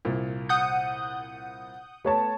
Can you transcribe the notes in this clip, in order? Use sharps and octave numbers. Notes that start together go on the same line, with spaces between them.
C2 A#2
F#5 D#6 G6
A3 B3 C#5 A5